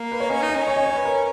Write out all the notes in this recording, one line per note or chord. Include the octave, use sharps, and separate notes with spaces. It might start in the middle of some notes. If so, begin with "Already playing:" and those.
Already playing: A#3
B4
C#5
C#4 D#5
D#4
D#5
C#4
C#5
D#5
C#5
B4
A#4